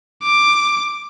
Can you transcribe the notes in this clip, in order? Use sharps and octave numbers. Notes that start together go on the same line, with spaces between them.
D6